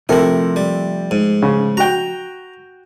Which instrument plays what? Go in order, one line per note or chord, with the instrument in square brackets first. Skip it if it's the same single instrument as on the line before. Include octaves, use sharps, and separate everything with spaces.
[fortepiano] C3 [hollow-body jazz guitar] F3 A3 A4 [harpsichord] E4 A#4
[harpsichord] G3
G#2
[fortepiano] C#3
[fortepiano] F#4 G5 [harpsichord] A#5